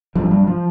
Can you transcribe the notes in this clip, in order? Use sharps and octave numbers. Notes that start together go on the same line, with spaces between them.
G2 F3
G2 G3
F3